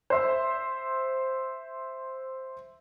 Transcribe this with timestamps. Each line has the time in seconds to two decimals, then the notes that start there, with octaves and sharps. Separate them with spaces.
0.10 C5 E5 C6